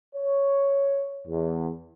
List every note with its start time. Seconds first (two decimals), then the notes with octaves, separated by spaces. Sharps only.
0.15 C#5
1.27 E2